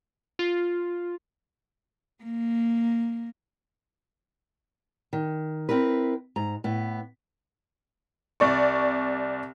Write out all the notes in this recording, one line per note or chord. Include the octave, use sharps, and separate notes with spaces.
F4
A#3
D#3
C4 E4 A#4 B4
G#2 A#5
A2 B3
C2 D5 C#6